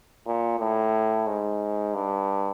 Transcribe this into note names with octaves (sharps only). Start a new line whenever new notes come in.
A#2
A2
G#2
G2